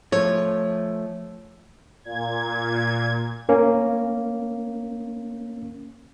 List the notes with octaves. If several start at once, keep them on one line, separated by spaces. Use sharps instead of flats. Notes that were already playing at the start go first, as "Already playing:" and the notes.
F3 A3 C#5
A#2 G#6
A#3 C#4